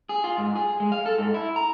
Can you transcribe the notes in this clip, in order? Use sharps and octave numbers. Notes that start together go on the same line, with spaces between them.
G#4
F4
G#2
G#4
G#3
F5
A4
G#2
E4
A#5